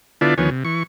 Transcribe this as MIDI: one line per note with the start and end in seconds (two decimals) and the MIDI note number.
0.21 0.34 50
0.21 0.34 59
0.21 0.34 64
0.21 0.34 65
0.21 0.34 74
0.21 0.34 81
0.38 0.50 38
0.38 0.50 51
0.38 0.50 53
0.38 0.50 59
0.38 0.50 73
0.38 0.50 80
0.51 0.64 48
0.65 0.83 52
0.65 0.83 85